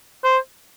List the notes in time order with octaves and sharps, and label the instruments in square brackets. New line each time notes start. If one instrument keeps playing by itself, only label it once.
[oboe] C5